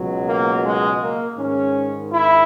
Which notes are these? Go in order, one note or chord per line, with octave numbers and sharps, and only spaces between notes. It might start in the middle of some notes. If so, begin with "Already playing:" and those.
Already playing: C#2 B2 F#3
A#3
G#3
A#3
G#2 D#3 G#3 C#4
E4